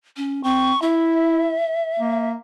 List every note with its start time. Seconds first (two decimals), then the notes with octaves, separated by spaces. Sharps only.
0.17 C#4
0.44 C4 C#6
0.82 E4 E5
2.00 A#3